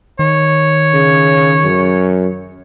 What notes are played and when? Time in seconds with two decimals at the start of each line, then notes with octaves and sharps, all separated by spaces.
0.19 D#3 C#5
0.93 C#3
1.64 F#2